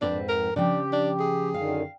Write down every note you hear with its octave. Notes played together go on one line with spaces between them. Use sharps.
F2 G#2 C4 D4 B4
A#4
C#3 F3 D4 G4 G5
D4
G#4
F#2 D3 D#3 F5